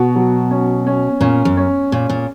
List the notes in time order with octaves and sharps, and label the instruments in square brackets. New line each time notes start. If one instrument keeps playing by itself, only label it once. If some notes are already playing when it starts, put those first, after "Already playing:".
Already playing: [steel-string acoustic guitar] B2 [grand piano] F#4
[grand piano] F#3
C#4
C#4
[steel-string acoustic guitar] A#2 [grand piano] C#4
[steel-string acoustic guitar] F#2
[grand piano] C#4
[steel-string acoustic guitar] A#2 [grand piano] C#4
[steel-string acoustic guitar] A#2